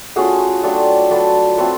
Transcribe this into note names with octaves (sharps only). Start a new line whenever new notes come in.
A3 C#4 F4 F#4 G#4
F#3 A3 D4 F4 G4 A4
F#3 A3 D4 F4 A4 B4
A3 C4 F4 A4 B4